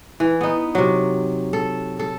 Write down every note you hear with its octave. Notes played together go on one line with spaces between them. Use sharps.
E3
B3 D#4
C3 F#3
A4
A4